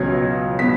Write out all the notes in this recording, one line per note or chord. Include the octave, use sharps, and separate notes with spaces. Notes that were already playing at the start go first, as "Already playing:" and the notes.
Already playing: C#2 B2 F#3 C#4 F4 G#6
B2 F#3 B3 B6